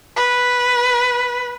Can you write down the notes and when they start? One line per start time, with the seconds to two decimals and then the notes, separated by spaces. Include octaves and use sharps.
0.17 B4